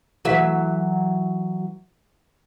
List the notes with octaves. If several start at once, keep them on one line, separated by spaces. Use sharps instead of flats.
E3 F#3 E5